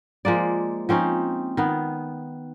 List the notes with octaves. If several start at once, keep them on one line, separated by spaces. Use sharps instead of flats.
F3 G#3 A#3 D5
F3 C4 C#4 D#4
D#3 B3